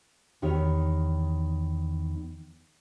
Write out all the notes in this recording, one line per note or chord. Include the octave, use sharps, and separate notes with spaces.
E2 D#3 G4 C#5